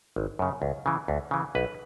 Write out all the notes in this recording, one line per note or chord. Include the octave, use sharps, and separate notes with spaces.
G#1
F#2 C#3
C#2
C#3 E3
D2
C#3 E3
B1 B4